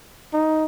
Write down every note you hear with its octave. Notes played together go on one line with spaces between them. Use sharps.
D#4